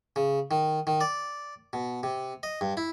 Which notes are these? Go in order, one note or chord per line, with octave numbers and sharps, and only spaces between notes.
C#3
D#3
D#3
D5
B2
C3
D#5
G2
E4